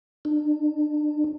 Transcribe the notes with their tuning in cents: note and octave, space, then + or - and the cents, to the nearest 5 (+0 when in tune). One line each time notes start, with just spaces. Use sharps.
D4 +30